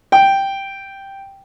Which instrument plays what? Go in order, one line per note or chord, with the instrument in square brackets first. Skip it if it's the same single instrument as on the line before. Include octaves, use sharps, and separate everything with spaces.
[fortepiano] G5